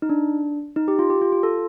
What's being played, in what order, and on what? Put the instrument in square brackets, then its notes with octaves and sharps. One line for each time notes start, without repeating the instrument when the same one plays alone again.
[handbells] D#4
D4
D#4
G4
F4
G4
F4
F4
A4